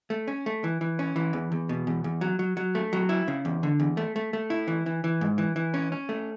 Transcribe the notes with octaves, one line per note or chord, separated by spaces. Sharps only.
A3
C#4
A3
E3
E3
C#4
E3
E2
E2
B2
E2
E2
F#3
F#3
F#3
A3
F#3
E4
C#3
E2
D3
E2
A3
A3
A3
E4
E3
E3
E3
G#2
E3
E3
C#4
C#4
A3